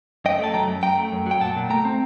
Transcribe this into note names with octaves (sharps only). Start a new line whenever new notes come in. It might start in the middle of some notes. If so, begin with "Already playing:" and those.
F#2 D#5 G5
A3 A5
F#3 G5 A#5
F#2
F#2 G5 A#5
A3
F#2
F#3 G5
A#2 F#5 A5
A#2
A3 G5 A#5
C4